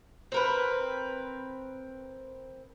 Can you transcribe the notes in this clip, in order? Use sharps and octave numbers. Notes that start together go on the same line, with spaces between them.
C4 A#4 B4